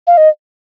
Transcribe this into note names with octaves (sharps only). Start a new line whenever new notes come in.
F5
D#5